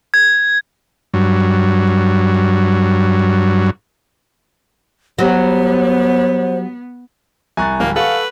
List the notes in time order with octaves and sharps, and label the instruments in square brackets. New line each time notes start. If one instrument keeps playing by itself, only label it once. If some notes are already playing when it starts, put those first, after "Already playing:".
[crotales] G#6
[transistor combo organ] G2 F#3
[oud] F#3 G3 [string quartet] B3 [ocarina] C5
[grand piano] C2 C#6 A6 [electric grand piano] G#5 A#5 F#6
[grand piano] D1 G3 [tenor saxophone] A#3
[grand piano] A4 F#5 C#6 [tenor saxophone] B4 [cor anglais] F5